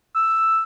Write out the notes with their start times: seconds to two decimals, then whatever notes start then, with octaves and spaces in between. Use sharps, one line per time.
0.15 E6